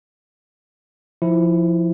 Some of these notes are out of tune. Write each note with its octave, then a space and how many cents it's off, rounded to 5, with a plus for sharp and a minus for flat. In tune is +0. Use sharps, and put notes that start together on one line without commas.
F3 -5 E4 +0